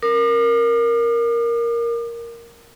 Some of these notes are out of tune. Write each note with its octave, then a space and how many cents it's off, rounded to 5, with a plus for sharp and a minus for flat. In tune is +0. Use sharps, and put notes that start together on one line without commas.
A#4 +0 D6 +45